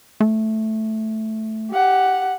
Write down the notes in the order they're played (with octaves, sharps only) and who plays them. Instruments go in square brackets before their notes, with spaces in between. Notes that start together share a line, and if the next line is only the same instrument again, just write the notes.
[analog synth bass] A3
[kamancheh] G4 F#5